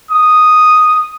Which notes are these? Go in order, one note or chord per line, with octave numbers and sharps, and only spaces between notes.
D#6